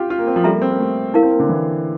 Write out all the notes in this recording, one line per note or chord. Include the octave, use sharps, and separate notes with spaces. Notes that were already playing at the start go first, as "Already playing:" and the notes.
Already playing: F4 G4
F4
A#3
C4
F3
G3 A4 E5 A#5
A#3
C4
A#3
A3
E4 A#4 F5
C4
A#3
D3
E3